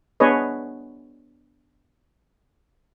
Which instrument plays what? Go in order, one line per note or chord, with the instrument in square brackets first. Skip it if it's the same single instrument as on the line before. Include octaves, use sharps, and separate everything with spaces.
[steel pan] B3 D4 G#4 B4 C#5 D#5